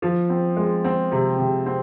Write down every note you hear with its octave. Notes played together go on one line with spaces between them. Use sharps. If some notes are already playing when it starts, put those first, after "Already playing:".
F3
C4
G#3
C4
C3
C3
C4